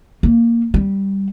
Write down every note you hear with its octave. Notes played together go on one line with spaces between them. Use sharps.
A#3
G3